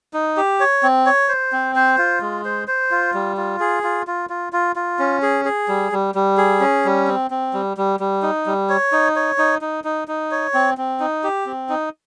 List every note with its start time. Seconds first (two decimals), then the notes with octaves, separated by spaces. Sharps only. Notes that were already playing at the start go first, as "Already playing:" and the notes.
0.14 D#4
0.37 G4
0.60 C#5
0.83 C4
1.06 C#5
1.29 C5
1.52 C4
1.75 C5
1.98 F4
2.21 G#3
2.45 C5
2.68 C5
2.91 F4
3.14 G3
3.37 F4
3.60 G#4
3.84 F4
4.07 F4
4.30 F4
4.53 F4
4.76 F4
4.99 C#4
5.22 G#4
5.45 G#4
5.68 G3
5.92 G3
6.15 G3
6.38 G#4
6.60 C#4
6.85 G3
7.08 C4
7.31 C4
7.54 G3
7.77 G3
8.00 G3
8.23 D#4
8.46 G3
8.69 C#5
8.92 D#4
9.16 C#5
9.38 D#4
9.61 D#4
9.84 D#4
10.08 D#4
10.31 C#5
10.54 C4
10.78 C4
11.00 D#4
11.24 G4
11.46 C4
11.69 D#4